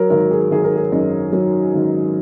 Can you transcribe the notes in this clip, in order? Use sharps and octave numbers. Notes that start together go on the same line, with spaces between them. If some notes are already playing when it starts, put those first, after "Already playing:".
Already playing: F#3 A#4
G#1 A#4
G#4
G#1 G#4
A#4
G#4
F#2 D#4
F#3
G#1